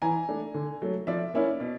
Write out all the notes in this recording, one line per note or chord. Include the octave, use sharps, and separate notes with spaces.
E3 G#5 A#5
A3 D4
D3
F#3 A3
F3 D5 E5
A#3 C#4 E4
B2